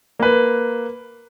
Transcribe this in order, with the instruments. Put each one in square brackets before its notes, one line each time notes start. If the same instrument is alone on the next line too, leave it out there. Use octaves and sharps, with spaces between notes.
[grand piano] A#3 B4